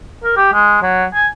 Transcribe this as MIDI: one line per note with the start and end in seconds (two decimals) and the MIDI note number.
0.24 0.36 70
0.36 0.49 67
0.53 0.78 56
0.82 1.05 54
1.14 1.27 80